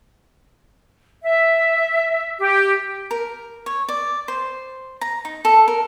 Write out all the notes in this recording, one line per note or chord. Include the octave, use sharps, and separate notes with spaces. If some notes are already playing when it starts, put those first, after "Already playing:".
E5
G4
A#4
C#5
D5
C5
A#5
D#4
A4
A#4